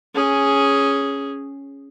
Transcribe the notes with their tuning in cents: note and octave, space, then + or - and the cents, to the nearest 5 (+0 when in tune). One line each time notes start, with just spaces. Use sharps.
C#4 +0 G#4 +0